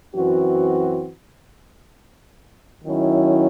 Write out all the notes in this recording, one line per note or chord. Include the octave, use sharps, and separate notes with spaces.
F#2 E3 C4 F#4
D#3 F#3 C#4 E4